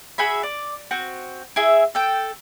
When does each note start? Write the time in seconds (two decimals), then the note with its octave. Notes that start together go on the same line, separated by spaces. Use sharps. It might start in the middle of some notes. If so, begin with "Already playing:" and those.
0.18 F#4 G#4 E5 B5
0.43 D5
0.91 C4 F#4 F#6
1.56 E4 G#4 E5
1.95 A4 G5